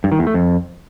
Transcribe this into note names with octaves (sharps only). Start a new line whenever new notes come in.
G2
D#3
E2
A3
F2